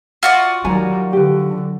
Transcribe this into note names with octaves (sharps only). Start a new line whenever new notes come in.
F4 F#4 D5
D#3 F#3 G3 G#5 A#5
D3 G4 B4